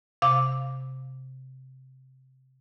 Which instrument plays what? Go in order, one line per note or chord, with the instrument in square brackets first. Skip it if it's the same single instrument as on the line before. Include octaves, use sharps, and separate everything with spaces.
[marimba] C3 F5 D6